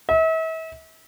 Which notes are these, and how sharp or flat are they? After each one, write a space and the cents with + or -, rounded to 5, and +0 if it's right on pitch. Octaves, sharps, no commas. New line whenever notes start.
E5 -40